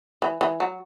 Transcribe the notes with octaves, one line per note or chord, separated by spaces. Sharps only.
E3
E3
F#3